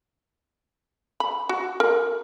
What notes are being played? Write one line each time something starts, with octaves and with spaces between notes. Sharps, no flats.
B5
F#4
A#4